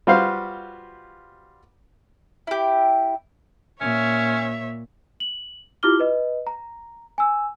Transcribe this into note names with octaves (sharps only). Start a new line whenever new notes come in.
G3 F4 F#4 B4 C5 F5
E4 G4
A#2 C#4 C#5 E5
F#7
E4 F4 G4 D6 F6 G7
B4 D#5
A#5
G#5 E6